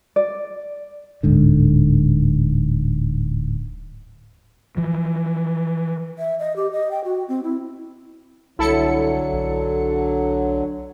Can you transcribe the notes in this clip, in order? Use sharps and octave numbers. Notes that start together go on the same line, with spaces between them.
D5
D1 G#2 D3
E3 F3
E5
D#5
G4
D#5
G5
F#4
C4
E4
C2 D3 F#3 E4 A4 C#7
B1